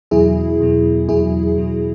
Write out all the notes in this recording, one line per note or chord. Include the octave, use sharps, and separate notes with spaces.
E2 B2 F#3 E4 G#4
E2 B2 F#3
E2 B2 F#3 E4 G#4
E2 B2 F#3